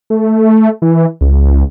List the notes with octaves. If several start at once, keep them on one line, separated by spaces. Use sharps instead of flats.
A3
E3
C#2